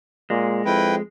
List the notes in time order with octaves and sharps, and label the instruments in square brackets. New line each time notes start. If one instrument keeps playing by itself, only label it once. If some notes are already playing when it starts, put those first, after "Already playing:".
[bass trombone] A#2 [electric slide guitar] G#3
[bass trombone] F2 [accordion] E4 B4 G5